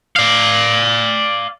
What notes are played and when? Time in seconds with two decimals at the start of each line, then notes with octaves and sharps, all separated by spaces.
0.16 D5 F5